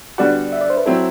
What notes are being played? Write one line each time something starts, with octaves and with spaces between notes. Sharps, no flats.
D3 G3 B3 F#4 D5
E5
D5
C5
B4
F#3 C4 E4 A4